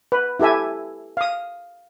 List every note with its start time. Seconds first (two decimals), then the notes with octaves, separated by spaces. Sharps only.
0.12 B4
0.40 E4 G4 A4 E5 G#5
1.17 F5 D#6